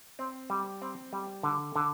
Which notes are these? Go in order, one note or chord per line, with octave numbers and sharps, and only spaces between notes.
C4
G3
C4
G3
D3
D3